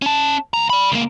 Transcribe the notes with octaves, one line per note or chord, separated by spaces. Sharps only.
C#4 A5
C#2 A#5
D5 B5
C#2 A#3